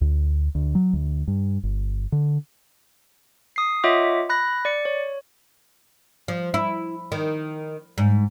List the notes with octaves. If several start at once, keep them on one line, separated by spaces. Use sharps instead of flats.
D2
D2
F#3
D2
G2
G1
D3
D#6 C7
F4 C#5 D#5 E5 F#5 D6
B5 F#6 A#6
D5 C#7
C#5
F3
E4
D#3
G#2